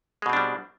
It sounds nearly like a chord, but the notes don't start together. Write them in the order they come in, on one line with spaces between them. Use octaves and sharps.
G#3 B2 C4 D4 G3